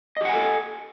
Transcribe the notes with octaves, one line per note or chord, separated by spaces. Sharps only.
G4 A4 D#5 F#5 G#5